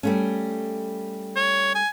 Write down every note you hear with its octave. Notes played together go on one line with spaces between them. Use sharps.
G3 A3 C#4
C#5
G#5